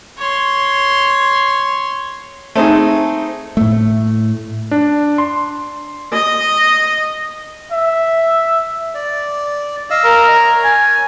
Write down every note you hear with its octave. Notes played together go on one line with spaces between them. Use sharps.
C#5 C6
A3 C4 D#4 G#4
A2 A3
D4
C6
D#5
E5
D5
D#5 F5 E6
A#4
C#5
G#5